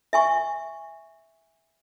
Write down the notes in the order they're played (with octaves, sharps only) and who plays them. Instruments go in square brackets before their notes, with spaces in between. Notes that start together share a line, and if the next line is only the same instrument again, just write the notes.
[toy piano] E5 G#5 C#6